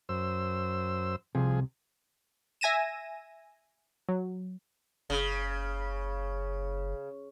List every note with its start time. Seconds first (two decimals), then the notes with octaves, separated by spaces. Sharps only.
0.09 F#2 C5 E6
1.35 C2 C3 F3 G#4
2.61 E5 G#5 A#6 D#7 E7
4.09 F#3
5.10 F#1 C#3